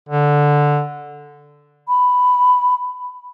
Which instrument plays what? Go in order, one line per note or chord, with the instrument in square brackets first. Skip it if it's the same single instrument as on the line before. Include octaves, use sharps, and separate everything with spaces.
[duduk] D3
[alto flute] B5